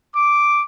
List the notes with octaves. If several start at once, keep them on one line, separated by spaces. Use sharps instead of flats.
D6